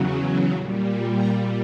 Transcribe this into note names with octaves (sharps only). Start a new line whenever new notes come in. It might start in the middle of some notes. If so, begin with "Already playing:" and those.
Already playing: E2 C#3 F#3
A#2 G3
A#5